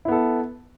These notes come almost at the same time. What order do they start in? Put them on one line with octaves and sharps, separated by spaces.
E4 B3 A4